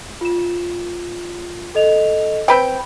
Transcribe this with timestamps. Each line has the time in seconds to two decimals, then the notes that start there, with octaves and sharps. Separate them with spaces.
0.21 F4 E7
1.75 A4 D#5 F7
2.48 C4 B4 G5 B5